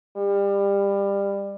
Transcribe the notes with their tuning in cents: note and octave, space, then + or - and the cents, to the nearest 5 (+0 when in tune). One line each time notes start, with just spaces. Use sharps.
G3 +25